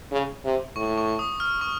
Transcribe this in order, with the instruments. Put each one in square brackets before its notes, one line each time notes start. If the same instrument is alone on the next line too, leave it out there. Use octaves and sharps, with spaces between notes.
[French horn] C#3
C3
[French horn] A2 [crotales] C#6
[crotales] C#6
D#6
F6
C#6